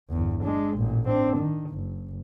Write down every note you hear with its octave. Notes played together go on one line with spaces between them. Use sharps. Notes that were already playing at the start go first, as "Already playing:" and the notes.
G1 E2
G#3 D4
A1 A#2
C4 D4
D#3
F#1